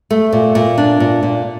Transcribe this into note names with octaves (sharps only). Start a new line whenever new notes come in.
A3
A#2
A#2
D4
A#2
A#2